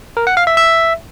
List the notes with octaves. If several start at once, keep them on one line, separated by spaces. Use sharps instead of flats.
A#4
F#5
F5
E5
E5